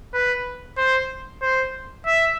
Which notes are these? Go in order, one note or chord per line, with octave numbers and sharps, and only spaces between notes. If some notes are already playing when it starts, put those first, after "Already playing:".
B4
C5
C5
E5